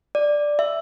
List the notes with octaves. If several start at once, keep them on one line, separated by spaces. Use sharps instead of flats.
D5
E5